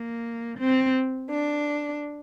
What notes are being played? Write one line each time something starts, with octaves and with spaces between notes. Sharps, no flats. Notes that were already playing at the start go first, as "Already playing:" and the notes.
Already playing: A#3
C4
D4